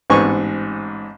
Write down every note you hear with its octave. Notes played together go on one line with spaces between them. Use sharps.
A1 G#2 B3 C4 G#5 C#6